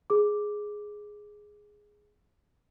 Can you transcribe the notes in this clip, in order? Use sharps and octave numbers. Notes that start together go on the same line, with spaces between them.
G#4 D6